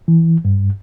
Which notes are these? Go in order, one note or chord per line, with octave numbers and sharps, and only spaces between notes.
E3
G2